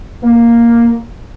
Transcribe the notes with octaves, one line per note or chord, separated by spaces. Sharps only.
A#3